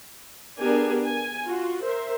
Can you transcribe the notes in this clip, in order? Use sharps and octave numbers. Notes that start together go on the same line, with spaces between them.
B3 D4 G4 G#4 A#4 G#5
G#5
F4 F#4
A#4 C5 E5